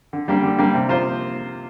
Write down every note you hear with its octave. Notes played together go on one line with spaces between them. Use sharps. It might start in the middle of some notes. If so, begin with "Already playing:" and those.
D3
G3 A#3 D4 G4
D3
G3 A#3 D4 G4
C3
F3 A#3 F4 C5